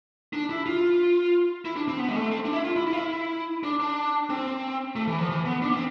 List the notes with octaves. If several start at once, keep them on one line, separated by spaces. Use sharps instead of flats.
D4
E4
F4
E4
D4
C4
B3
G#3
A3
C4
D4
E4
F4
E4
E4
F4
E4
D4
D4
C4
A3
E3
F3
E3
B3
D4
B3
C4